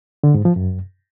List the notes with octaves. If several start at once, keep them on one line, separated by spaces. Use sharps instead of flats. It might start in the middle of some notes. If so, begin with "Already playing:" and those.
D3
G#2
F3
F#2